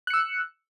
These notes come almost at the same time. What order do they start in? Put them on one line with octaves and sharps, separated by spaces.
F#6 C#7 E6